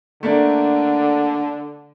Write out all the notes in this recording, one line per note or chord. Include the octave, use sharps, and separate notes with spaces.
D3 A3 A#3 D4